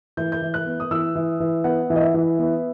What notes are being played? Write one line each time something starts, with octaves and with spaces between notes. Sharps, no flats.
E3 G6
G6
E3
F#6
B3
D#6
E3 E6
E3
E3
B3 F#5
E3
D#5
E5
E3
B3